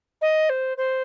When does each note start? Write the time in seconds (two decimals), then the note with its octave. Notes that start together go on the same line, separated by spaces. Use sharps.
0.21 D#5
0.49 C5
0.77 C5